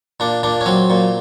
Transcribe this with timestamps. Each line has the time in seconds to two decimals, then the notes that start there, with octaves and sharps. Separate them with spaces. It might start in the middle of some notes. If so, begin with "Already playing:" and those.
0.20 A#2 D4
0.43 A#2 D4
0.61 C#4
0.66 F#3 C4
0.90 A#2